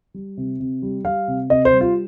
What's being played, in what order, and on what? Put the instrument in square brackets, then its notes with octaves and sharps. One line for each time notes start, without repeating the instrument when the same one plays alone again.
[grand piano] G3
C3
C3
G3
G3 F5
C3
C3 D#5
C5
G3
F4